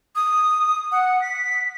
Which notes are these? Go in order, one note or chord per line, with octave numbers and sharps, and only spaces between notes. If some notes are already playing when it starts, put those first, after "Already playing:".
D#6
F#5
B6